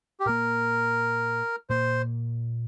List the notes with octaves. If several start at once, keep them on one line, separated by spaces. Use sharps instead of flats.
G4
A#2 A#3 A#4
A#2 A#3 C5